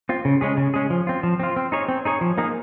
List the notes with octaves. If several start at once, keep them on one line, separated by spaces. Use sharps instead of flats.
C4 F4
C#3
G#3 C#4 G#4
C#3
G#3 C#4 G#4
F3
C4 F4
F3
C4 F4
C4
D#4 G#4 C#5
C4
D#4 G#4 C#5
F3
A#3 D#4 G#4